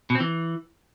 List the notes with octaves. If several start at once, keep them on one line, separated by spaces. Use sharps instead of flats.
B2
C4
E3